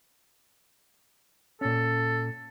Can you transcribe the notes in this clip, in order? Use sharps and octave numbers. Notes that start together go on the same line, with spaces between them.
A#2 C#4 A4